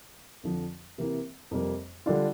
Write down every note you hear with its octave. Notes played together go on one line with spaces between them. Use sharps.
F2 D3 F3
C3 E3 A#3
F2 C3 G3 A#3
D3 G3 D4 F4